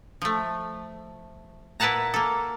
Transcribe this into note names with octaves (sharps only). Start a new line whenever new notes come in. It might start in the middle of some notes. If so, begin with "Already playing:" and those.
F3 A3
A#2 E4 B4 F#5 A5 A#5
A#3 A4